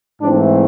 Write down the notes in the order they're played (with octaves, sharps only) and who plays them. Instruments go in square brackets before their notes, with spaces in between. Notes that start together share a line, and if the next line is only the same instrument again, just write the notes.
[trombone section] G#2 E3 A3 C4 D4